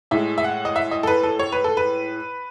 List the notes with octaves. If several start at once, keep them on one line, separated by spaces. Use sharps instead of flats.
A2 G#3 E5
E5
F#5
D#5
E5
D#5
A4
B4
A4
C#5
B4
A4
B4